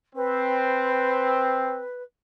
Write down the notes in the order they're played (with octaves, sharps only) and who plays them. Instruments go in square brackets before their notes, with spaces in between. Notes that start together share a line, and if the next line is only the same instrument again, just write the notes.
[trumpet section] C4 [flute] B4